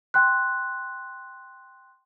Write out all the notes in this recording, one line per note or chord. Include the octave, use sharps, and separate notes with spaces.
G5 C6 F#6